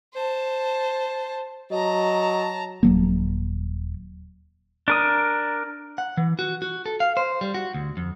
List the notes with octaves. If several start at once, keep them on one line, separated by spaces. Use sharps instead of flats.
C5 A5
F#3 D#5 A5 A#5
D#1 F#3 A#3
D4 A#4 D#6
F#5
E3
F#4
F#4
A4
F5
C5
G3
F#4
D2
F2